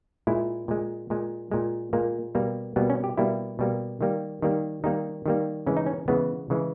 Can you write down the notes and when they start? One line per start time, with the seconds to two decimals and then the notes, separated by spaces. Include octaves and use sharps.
0.27 A#2 G#3 E4
0.68 A#2 G#3
1.10 A#2 G#3
1.51 A#2 G#3
1.93 A#2 G#3 A#3
2.35 B2 G3 A#3
2.76 B2 G3 A#3 B3
2.90 C#4
3.04 G4
3.17 B2 G3 A#3 E4
3.59 B2 G3 A#3
4.01 D#3 G3 A#3
4.42 D#3 G3 A#3
4.84 D#3 G3 A#3 D#4
5.26 D#3 G3 A#3
5.66 C#3 E3 G#3 C#4
5.77 D#4
5.86 C#4
6.08 C#3 E3 G#3 B3
6.50 C#3 E3 G#3